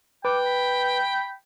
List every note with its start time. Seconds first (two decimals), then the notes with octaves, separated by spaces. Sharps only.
0.25 B4 G5 D6
0.46 B5